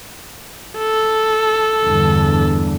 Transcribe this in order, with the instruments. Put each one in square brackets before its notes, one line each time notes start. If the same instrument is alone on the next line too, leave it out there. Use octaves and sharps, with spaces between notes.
[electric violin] A4
[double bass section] E2 G2 D3